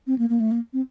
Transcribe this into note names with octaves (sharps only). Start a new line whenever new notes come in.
C4
A#3
A#3
A3
A#3
C4